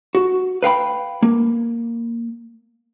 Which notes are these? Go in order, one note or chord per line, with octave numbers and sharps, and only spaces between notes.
F#4
B4 F5 G5 B5
A#3